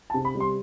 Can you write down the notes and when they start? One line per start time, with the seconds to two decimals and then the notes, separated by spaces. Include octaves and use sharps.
0.10 A5
0.14 C3
0.25 B5
0.35 G3
0.40 C6